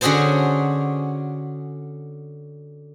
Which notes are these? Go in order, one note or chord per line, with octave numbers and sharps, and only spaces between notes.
D3 C#4 F#4 G#4 C5 A5